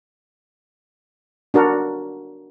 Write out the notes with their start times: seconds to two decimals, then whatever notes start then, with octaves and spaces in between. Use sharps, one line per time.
1.54 D4 F#4 A#4